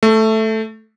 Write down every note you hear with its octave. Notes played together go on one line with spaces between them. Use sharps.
A3